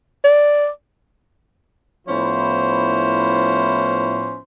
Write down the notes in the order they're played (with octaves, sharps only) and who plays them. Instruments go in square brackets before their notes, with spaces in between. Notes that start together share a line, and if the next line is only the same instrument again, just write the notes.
[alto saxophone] D5
[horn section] A2 F3 B3 C#4 E4 C5